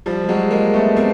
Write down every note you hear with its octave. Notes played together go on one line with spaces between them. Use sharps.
F3 G3
G3
F#3 G#3
G#3 A#3
A3 B3
A#3 C4